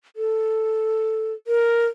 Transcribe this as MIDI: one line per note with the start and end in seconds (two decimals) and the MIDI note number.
0.16 1.33 69
1.47 1.86 70